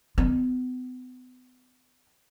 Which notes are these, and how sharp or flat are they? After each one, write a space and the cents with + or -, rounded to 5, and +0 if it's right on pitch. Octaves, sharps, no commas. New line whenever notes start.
B3 +40